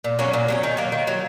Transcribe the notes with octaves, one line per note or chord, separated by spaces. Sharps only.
A#2
F#3 A#3 C#4
A#2
F#3 A#3 C#4
D#3
F#3 A#3
D#3
F#3 A#3